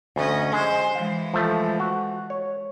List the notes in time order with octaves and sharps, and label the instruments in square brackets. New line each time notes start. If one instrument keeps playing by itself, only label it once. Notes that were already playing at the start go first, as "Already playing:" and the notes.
[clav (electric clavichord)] D2 [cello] C#4 D#5
[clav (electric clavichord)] G#3 [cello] C5
[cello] E3 G#3 [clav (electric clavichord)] F5
[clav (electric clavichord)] F3 A3
F#4
C#5